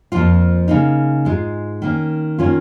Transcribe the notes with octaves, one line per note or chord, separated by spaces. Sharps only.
F2 F3 A#3 F4
C#3 A#3 D#4
G#2 G#3 F4
D#3 A#3 C#4
D#3 A#3 C#4 F4